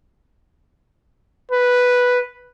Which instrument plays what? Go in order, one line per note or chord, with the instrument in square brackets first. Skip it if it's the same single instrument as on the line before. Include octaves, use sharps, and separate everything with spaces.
[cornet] B4